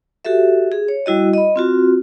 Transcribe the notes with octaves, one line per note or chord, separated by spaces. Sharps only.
F#4 G4 A4 E5
G#4
C#5
G3 E4 F#4 D#5
D#5 B5
C4 F4 F#4